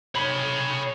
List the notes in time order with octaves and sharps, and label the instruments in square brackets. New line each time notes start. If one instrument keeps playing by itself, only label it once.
[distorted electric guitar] C#5 B5